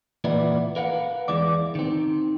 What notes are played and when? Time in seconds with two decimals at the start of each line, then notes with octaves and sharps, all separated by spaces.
0.24 E2 A#2 E3 B3 D5
0.76 A#4 B4 F5 F#5
1.28 E2 E3 G#3 D5
1.75 D#3 C4